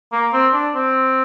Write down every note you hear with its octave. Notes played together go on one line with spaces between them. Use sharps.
A#3
C4
D4
C4